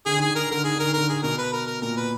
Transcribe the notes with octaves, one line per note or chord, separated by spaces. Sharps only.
D3 G#4
D#3 G#4
D3
D#3 A#4
D3 A#4
D#3 G#4
D3
A#4
D#3
D3 A#4
G#4
B2 A#4
B4
A#4
A#4
A#2 A#4
B4